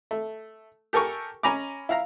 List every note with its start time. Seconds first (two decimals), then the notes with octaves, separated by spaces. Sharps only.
0.11 A3
0.93 G4 A4 A#4 G#5 C#6
1.43 C#4 G#5 A#5 B5 D6
1.89 E4 F5 A#5